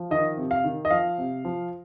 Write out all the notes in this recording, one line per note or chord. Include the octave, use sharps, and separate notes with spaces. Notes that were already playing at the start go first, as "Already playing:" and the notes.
Already playing: F3
D#3 D#5
C3
F5
D#3
D#5
F3 F5
C3
F3